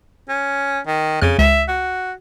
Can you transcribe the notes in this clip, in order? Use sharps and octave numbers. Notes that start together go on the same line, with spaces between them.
C#4
D#3
F2 C#3 F6
C#2 E5
F#4